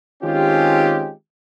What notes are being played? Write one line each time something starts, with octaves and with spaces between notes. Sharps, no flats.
D#3 G#3 C4 C#4 F4 G4